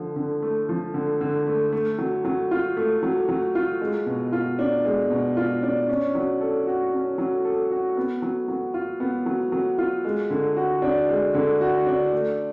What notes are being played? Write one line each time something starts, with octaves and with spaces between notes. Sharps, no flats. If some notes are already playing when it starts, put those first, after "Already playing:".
Already playing: D3 F3
D3
A3
F3
D3
D3
A3
A3
F#3
F#3
F4
A3
F#3
F#3
F4
G#3
B2
F4
D4
G#3
B2
F4
D4
C#4
F#3
A4
F#4
C#4
F#3
A4
F#4
B3
F#3
F#3
F4
B3
F#3
F#3
F4
G#3
D3
F#4
D4
G#3
D3
F#4
D4
A3